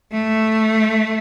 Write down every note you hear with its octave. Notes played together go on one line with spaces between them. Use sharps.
A3